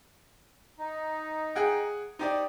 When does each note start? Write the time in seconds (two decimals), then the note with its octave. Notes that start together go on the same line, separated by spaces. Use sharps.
0.78 D#4
1.55 G#4 F#5 G5
2.19 D#4 G4 C5 D5